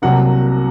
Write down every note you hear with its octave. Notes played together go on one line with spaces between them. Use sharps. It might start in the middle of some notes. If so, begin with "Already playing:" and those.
C2 C3 F#3 A#3 F#5